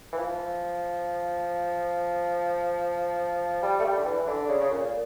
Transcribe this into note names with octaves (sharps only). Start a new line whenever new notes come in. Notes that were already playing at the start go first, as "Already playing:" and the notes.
E3
F3
G3
A3
G3
D3
E3
D3
C#3
C#3
A#2